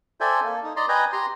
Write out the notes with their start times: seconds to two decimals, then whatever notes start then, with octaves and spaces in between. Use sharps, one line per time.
0.21 A4 C5 D5 E5 G5 G#5
0.44 A#3 A4
0.63 D#4
0.76 D5 D#5 A#5 C6
0.89 B4 D#5 G5 G#5 A#5
1.12 G4 A#5 C6